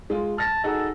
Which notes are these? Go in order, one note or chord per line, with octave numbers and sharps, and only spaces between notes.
G#3 F4
A5 F6 A#6
D#4 F#4 G#4 A4